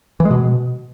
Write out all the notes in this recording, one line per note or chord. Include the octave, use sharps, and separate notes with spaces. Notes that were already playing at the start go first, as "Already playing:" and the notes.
E3
G#3
B2